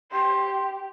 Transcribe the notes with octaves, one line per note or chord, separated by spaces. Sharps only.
G4 C6